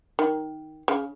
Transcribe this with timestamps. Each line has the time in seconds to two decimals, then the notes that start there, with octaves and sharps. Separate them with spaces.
0.19 D#3
0.88 C#3